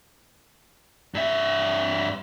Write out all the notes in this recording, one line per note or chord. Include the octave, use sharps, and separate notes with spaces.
G2 E5